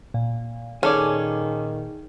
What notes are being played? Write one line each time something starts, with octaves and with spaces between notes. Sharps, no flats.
A#2
D#3 C#4 G#4 A4 D5